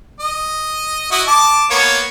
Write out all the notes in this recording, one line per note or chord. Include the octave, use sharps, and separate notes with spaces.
D#5
E4 F#4 D#5
A5 D6
A#3 B3 C#5